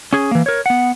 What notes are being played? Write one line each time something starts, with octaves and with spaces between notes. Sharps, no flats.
C#4 G#4
E3 A#3
A#4 C#5
B3 F#5